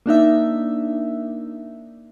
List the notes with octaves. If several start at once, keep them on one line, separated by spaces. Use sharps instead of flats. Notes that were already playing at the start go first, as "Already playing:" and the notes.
A#3 D4 D#4 E5